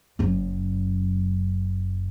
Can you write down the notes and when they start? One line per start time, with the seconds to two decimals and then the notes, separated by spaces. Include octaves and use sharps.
0.19 F#1 F#2